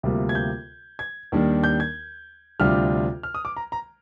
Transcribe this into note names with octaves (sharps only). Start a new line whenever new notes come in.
D2 C3 G3 A#3 F4
G#6
G6
G#6
D#2 D#3 G3 D4
G6
G#6
D2 C3 G3 D4 F4 F6
F6
D#6
D6
A#5
A#5